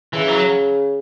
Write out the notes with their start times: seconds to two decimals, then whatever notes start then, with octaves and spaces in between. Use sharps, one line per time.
0.14 C#3 E3
0.28 F#3